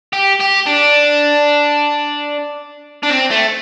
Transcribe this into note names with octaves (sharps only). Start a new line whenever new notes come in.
G4
G4
D4
D4
C4
A3